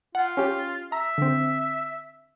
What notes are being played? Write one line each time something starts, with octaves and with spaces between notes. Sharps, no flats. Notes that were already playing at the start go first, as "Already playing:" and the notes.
F4 F#5
C#4 G4
E5 A#5
D3 C4